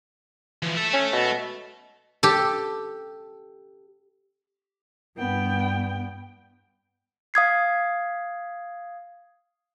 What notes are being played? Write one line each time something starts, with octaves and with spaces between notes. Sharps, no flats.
E3 F3
A4 E5
C#4
B2
G4 A4
G2 B3 G5
F5 D#6 G#6 C7